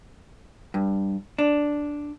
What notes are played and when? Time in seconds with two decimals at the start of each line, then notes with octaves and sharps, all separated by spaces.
0.74 G2
1.38 D4